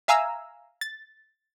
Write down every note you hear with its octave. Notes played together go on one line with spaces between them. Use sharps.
E5 F5 G#5 A#5 E6
A6